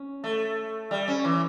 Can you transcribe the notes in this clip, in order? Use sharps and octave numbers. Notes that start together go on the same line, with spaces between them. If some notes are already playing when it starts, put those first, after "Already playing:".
Already playing: C#4
A3
G3
C#4
E3